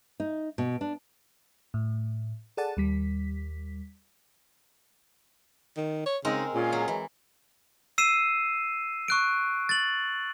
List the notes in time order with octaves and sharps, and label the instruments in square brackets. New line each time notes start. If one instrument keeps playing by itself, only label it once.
[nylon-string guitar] D#4
B2
D4
[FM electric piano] A2
G#4 A4 D5 F#5 A5
D#2 G3 B6
[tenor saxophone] D#3
C#5
[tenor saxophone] C#3 [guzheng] G#3 C4 A#4 [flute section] D#4
[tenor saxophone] A#2 [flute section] C#4 F4 G#4
[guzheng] F#3
[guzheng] E3 [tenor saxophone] G#3
[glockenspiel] E6 C7 D#7 E7
C#6 F#6 D7
A6 F#7